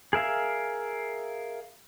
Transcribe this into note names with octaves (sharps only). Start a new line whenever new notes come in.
G#4 A#4 E5 F5